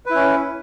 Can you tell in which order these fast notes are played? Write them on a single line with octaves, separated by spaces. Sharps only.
B4 E4 C#4